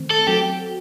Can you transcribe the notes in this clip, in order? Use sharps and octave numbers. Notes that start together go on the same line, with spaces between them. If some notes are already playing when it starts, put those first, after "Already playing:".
Already playing: D#3 A3 C4
A4
F#3 C4 F#4 G4 A4